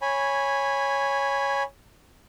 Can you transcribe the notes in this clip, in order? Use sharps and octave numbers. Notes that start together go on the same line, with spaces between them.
C#5 G#5 B5